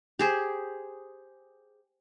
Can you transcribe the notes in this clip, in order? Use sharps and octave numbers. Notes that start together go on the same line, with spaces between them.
G4 G#4 C5